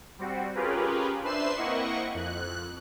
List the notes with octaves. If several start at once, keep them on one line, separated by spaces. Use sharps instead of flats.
G3 C4 F#4
C#4 F4 G4 G#4 A#4 B4
D4 B4 C5 E5 C7 E7
A#3 C4 E4 D#5 F#5 C#6
F2 F#6